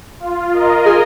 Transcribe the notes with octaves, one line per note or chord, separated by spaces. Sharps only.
F4
A#4 D#5
G#4